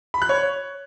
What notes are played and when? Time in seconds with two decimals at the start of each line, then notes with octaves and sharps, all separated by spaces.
0.14 B5
0.22 F#6
0.29 C#5